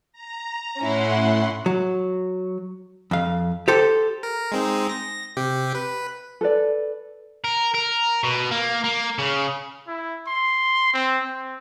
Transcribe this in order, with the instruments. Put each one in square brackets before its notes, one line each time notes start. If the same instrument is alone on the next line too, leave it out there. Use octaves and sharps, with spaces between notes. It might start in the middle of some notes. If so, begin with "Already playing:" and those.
[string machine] A#5
[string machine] A2 F#5 C6 [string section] C#4 E4
[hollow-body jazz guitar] F#3
F2 F5
G4 A4 C5
[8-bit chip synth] A#4
G#3 C4 D#4
A#6
C3 G4
B4
[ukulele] A4 B4 D5
[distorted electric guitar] A#4
A#4
B2
A#3
A#3
C#3
[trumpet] E4
C6
C4
C4